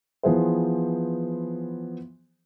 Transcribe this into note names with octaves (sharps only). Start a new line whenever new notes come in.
E3 F3 B3 G#4 C5